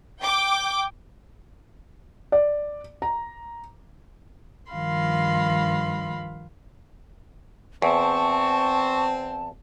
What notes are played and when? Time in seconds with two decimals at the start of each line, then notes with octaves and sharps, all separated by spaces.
0.22 G5 D6
2.32 D5
3.02 A#5
4.72 G2 D#3 F3 F5 B5 C6
7.82 E2 C4 A5 C#6